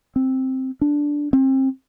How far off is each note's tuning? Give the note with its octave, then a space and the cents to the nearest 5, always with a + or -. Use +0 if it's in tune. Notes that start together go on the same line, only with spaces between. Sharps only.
C4 +5
D4 -5
C4 +30